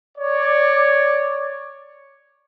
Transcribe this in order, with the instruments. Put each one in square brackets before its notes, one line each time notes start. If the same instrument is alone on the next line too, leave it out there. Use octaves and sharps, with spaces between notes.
[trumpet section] C#5 D5